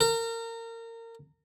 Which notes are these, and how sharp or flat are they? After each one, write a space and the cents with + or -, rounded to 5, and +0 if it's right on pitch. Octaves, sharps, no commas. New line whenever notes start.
A#4 -30